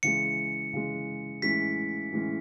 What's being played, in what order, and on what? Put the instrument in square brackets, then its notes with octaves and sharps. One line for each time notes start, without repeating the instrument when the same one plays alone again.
[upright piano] C#3 E3 G#3 [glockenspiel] C#7
[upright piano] C#3 E3 G#3
[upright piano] A2 E3 G#3 C#4 [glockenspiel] B6
[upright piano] A2 E3 G#3 C#4